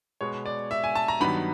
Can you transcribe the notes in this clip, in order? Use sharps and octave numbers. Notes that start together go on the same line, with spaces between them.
B2 G#3 B3 C#5
D5
E5
G#5
A5
A#5
G2 D#3 F#3 B3 B5